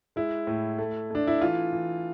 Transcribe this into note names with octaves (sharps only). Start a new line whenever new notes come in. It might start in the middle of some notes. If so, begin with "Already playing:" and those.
G#3 E4
A2
A3
A3 D4
E4
E3 F4
E3